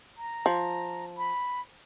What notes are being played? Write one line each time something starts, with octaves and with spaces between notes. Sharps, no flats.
A#5
F3
B5